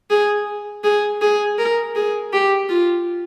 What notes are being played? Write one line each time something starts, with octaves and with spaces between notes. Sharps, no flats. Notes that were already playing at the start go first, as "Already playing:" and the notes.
G#4
G#4
G#4
A#4
G#4
G4
F4